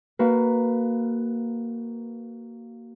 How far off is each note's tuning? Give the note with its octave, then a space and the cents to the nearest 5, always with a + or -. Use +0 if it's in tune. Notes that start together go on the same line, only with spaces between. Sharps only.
A#3 -5 F#4 +25 B4 +0